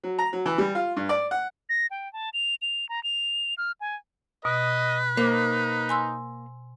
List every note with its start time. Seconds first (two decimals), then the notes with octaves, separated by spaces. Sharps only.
0.04 F#3
0.19 A#5
0.33 F#3
0.46 E3
0.58 G3
0.75 F4
0.97 G2
1.09 D5
1.31 F#5
1.69 A#6
1.91 G5
2.13 A5
2.34 F7
2.62 F7
2.89 A#5
3.04 F7
3.58 F6
3.81 G#5
4.45 B2 B4 D#5
5.17 A#3 D#4 C5 D6
5.89 G#5 C6 E6